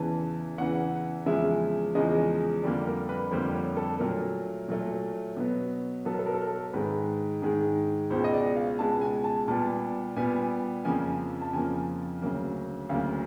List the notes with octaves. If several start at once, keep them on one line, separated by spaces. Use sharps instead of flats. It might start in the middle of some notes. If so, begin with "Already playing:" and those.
Already playing: E2 C#3 E3 A5
E2 C#3 E3 F#5
E2 C#3 F3 G#3 E5
E2 C#3 F3 G#3 D#5
F2 D3 G3 A#3 D5
A#4
B4
F2 D3 G3 A#3 C5
C#5
A4
A#2 F#3 A3 A#4
A#2 F#3 A3
B2 F#3 B3
B2 F#3 B3 A4
A#4
A4
A#4
A4
A#4
A4
G#2 D#3 G#3 B4
G#2 D#3 G#3
C#2 B2 G#3 C5
D#5
D5
F5
C#2 B2 G#3 A5
G#5
A5
A#2 G3 B3 A5
A#2 G3 B3 G#5
F2 C#3 F3 A#3 G#5
A5
F2 C#3 F3 A#3 G#5
D2 C#3 F#3 A#3
D2 C#3 F#3 A#3 F5